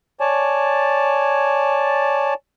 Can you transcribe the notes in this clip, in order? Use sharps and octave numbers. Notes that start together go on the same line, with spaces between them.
C#5 D5 G#5 A5